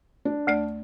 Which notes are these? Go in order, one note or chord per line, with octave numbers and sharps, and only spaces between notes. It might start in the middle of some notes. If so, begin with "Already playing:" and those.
D4
D2 A3 D5